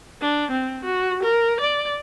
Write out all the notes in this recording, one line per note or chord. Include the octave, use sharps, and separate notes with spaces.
D4
C4
F#4
A#4
D5